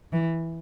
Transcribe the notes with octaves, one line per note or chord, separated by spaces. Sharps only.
E3